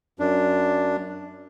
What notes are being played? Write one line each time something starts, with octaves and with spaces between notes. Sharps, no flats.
F#2 D4